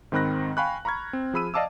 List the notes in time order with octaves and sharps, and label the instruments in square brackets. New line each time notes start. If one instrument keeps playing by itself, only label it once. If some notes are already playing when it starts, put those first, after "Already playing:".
[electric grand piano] G#2 D#3 C4 B5 F#6 A#6
F5 G5 G#5 B5 C#6 F#6
A#5 B5 C#6 F6 G#6
C4
F3 G#4 B5 E6 D#7
D5 D#5 F5 A5 D6 E6